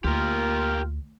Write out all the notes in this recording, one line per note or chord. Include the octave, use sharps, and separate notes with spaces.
D2 A#3 F4 G4 A#4